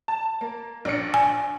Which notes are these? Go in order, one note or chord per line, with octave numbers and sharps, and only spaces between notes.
A5
A#3
A#1 D4 C#7
G#5